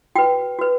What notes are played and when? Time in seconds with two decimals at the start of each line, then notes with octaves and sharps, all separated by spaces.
0.16 F#4 B4 G5
0.59 F#4 B4